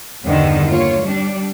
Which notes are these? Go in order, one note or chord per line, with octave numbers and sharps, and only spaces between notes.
E2 G2 D3 D#3
A#3 F4 C#5
G3 D4